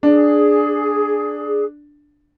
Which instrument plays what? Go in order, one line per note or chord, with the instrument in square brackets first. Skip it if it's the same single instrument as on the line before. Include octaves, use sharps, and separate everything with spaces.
[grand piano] D4 [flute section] G#4